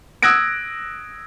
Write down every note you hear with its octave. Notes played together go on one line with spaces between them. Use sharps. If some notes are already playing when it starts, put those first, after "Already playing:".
D#6 E6 F#6 G#6 A#6 D7